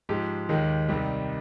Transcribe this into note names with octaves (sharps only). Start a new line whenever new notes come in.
G#2 F3 G#3 G4
D#2 D#3 G#3
C2 C3 D#3 G3